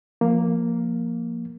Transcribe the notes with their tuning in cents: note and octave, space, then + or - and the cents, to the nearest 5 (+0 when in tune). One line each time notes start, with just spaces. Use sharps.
F3 +0 A#3 +0